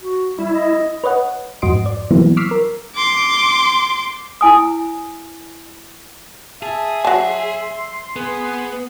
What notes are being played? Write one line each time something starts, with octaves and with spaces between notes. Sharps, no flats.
F#4
G3 E4
D#5
B4 C#5 D#5 F#5
F2 G#2 F#4 D#5 C6 D7
D5
E3 F#3 G3 A#3 B3 E4
C#6 D6 E6 F6 B6 C7
A#4
C6 D6
E4 G#5 D#6
G#4 E5 A5
F#3 A5 C6
B3 G#4